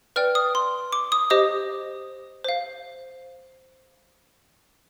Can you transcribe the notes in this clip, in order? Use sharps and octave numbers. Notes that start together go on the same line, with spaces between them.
B4 D5 G5 F6
D#6
C6
D6
D#6
G4 C5 D#5 D#6
C5 F5